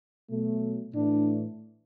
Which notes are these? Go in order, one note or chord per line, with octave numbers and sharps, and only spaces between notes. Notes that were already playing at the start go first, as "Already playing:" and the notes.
B2 F#3 A3
A2 E3 A3 D4